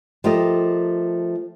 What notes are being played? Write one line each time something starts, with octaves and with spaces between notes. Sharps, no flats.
F3 A3 G4 A#4 D#5